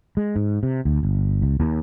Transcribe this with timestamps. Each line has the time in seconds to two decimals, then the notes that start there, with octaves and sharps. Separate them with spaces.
0.17 G#3
0.36 G#2
0.63 C3
0.85 D2
1.03 G1
1.42 C#2
1.60 D#2